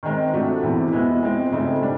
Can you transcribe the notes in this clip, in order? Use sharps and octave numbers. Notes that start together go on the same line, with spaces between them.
D#3 G#3 C4 D#4
C3 F3 A3 D4 F#4
E2 C3 E3
B2 G#3 B3 E4
F3 G#3 C4
C#3 F3 A3 C4 D#4
A#2 G3 D4